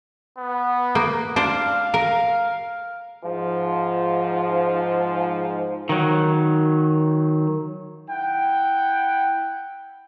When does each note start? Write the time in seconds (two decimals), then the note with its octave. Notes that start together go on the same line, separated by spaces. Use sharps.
0.38 B3
0.95 A#3
1.36 D4 C5 F5
1.94 A#4
3.24 G#2 F3
5.89 D#3 F#3
8.10 E4 F#5 G5